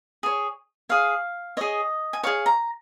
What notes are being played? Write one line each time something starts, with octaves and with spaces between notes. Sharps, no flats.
G#4 C#5
G#4 C#5 F5
G#4 C#5 D#5
G#5
G#4 C#5 F5
A#5